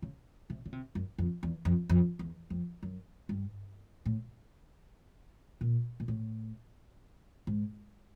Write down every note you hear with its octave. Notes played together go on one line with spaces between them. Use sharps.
C#3
C3
C#3
C3
F#2
F2
E2
F2
F2
E2
F2
F#2
G2
A2
A#2
A#2
A2
G#2